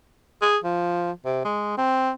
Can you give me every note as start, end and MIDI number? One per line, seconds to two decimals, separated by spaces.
0.41 0.57 68
0.64 1.11 53
1.25 1.40 48
1.45 1.76 56
1.77 2.11 60